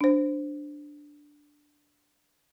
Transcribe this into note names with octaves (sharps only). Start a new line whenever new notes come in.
D4 C5